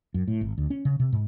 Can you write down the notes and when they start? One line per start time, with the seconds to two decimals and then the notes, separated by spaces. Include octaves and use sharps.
0.14 F#2
0.28 A2
0.41 G#1
0.58 D2
0.70 C#4
0.85 C#3
1.00 C3
1.13 G#2